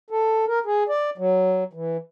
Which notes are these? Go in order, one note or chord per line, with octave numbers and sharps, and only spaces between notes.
A4
A#4
G#4
D5
F#3
E3